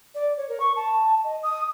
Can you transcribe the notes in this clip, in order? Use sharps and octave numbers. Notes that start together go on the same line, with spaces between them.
D5
C#5
A#4
C#6
A5
D#5
D#6